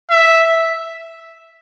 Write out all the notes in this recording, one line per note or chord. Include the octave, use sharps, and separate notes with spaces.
E5